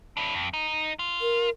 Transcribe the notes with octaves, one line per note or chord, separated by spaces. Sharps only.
D4 E4
F2
D#4
F4
A#4